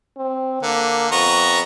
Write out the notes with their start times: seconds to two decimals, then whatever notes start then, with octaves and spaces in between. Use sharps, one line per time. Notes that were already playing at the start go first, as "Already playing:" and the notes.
0.17 C4
0.63 D3 A#3
1.12 F2 B3 A#5 C#6